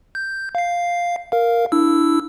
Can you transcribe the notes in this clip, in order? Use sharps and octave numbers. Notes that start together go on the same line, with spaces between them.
G6
F5 C7
A#4 F5
D4 E4 E6